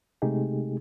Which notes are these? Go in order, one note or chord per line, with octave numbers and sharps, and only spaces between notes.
C3 G#3 A3 D#4 G4 G#4